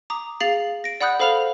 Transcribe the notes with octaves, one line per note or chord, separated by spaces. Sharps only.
A#5 D6 D#6
G#4 F5 A6 C7 F#7
A#6 D7
D5 F#5 B5 D#6 F#6 G6
A4 C5 F5 B5 F6 F7